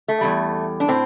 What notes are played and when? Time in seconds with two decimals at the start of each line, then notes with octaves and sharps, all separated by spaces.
0.08 A3
0.21 E2 C3 G3
0.80 D4
0.88 A2 C4